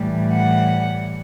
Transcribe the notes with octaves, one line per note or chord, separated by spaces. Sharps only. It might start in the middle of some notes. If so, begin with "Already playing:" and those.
Already playing: A2 E3 G3
F#5